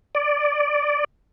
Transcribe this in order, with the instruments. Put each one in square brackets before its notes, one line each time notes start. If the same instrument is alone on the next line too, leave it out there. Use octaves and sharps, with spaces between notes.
[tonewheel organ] D5